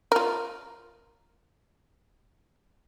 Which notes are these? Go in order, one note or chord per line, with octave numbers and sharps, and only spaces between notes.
F4 A#4